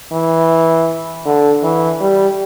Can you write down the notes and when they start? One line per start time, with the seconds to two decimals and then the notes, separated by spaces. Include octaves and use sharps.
0.12 E3
1.26 D3
1.63 E3
2.01 G3